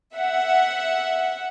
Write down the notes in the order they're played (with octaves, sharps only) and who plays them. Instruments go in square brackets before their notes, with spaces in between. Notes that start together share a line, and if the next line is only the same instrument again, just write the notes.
[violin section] E5 F#5